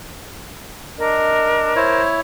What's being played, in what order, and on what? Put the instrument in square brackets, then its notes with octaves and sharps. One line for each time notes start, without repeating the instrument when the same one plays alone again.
[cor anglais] D4 [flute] A#4 [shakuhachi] D#5
[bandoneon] E4 C#5 [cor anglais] C5